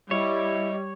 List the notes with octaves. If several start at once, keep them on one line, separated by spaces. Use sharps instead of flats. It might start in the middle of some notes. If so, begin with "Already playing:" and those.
G3 E4 C#5 D#5